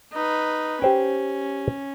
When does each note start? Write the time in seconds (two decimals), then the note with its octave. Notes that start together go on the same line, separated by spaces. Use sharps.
0.13 D#4 B4
0.82 C#4 G4 C5 G5